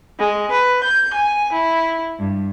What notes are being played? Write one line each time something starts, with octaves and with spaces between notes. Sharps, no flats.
G#3
B4
G6
G#5
E4
G2